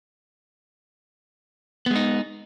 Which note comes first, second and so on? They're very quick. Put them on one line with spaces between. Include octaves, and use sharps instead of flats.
B3 G#3 D#4